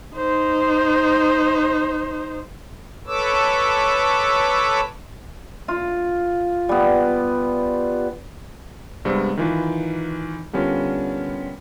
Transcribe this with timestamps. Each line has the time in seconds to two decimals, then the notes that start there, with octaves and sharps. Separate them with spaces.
0.15 D#4 C5
3.07 A4 B4 C#5 D6 E6
5.68 F4
6.69 G3 B3
9.05 G2 C3 G3 G#3 B3 C4
9.37 D#3 E3 F4 B4
10.53 D3 G3 B3 C#4 F4 A#4